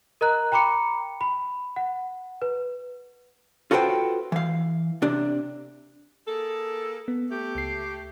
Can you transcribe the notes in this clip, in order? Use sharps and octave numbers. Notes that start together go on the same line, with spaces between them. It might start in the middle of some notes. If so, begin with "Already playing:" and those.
A#4 D#5 A#5 F#6
G5 A#5 B5 D6 C#7
B5
F#5
B4
F4 F#4 A4 B4 C5 G5
E3 F5
C3 D4
A#3 G#4 A4
B3
A3 G4
C#2 C7